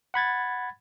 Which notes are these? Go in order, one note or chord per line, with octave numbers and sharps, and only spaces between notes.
F#5 B5 G#6 A6